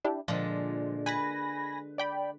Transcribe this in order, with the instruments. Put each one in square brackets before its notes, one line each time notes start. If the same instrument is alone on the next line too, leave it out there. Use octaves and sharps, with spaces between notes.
[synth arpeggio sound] D4 E4 G4
[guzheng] A#2 D3 G#3 [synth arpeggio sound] F3
[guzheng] B4 [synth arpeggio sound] G#5 B5 A#6
[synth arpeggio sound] D5 G5 B5